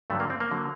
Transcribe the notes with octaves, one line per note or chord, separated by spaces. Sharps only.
G2 D3 F#3 A3
A#3
C4
A#3
D3 F#3